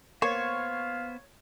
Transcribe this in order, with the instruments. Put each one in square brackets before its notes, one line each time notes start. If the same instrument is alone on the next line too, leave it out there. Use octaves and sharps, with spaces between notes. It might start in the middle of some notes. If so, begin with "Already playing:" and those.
[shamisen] A#3 [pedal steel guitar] B3 C5 [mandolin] C#5 [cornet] F5